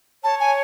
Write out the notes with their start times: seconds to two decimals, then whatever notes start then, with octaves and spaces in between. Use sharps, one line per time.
0.24 C#5 A5
0.40 G#5